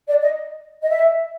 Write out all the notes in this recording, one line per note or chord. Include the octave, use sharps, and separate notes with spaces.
D5
D#5
D#5
E5